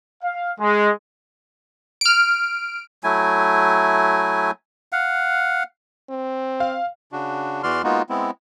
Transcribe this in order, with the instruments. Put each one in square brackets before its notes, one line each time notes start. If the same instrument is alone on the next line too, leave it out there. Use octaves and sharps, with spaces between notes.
[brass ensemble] F5
G#3
[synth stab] F6 D7
[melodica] F#3 A3 E4 G#5
F5 F#5
[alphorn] C4
[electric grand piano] F5
[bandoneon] C#3 D4 F#4
E2 E3 F#4 D5 C6 F6
G#3 A#3 B3 D#4 F4 F#4
G#3 B3 C4 E4